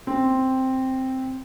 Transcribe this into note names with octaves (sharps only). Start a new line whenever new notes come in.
C4